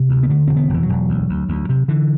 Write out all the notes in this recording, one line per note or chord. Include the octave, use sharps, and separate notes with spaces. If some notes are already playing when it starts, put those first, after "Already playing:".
Already playing: C3
D2
B3
D3 A3
E1 C4
B3
E1 E3
F#3
E1
D2
D2
D2
C3
D3 E3